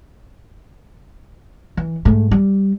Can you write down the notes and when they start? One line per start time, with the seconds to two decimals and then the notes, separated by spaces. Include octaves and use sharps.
1.77 E3
2.05 G#2 A3
2.31 G3